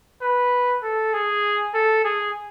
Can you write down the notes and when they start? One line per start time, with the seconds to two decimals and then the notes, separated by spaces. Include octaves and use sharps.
0.21 B4
0.83 A4
1.13 G#4
1.74 A4
2.04 G#4